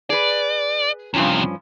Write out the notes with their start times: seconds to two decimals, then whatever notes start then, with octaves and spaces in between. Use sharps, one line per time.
0.10 G#4 B4 D5
1.14 E2 G2 C3 F3 C#4